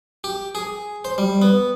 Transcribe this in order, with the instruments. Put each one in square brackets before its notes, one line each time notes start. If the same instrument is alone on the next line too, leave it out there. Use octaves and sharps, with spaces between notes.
[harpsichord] G4
G#4
C5
G3
B3